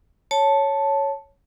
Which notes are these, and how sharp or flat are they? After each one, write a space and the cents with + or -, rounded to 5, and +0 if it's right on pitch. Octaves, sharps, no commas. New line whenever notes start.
C#5 +0 A5 +0